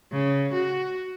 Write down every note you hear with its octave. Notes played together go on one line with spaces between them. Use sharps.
C#3
F#4